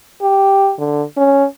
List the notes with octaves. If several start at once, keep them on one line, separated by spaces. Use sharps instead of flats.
G4
D3
C#4